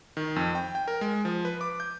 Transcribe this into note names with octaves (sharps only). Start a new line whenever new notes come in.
D#3
F2
G5
G5
A#4
G#3
F3
B4
D6
G6